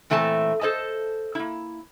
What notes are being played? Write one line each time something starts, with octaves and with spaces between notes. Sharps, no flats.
A#2 E3 A3 C4 A5
A4 C5 D#5 A5
A#3 E4